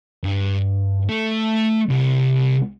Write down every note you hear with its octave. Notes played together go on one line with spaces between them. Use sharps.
G2
A3
C2